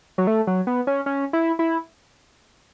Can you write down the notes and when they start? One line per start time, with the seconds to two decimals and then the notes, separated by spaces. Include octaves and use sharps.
0.18 F#3
0.27 A3
0.47 F#3
0.67 B3
0.87 C#4
1.06 C#4
1.33 E4
1.59 E4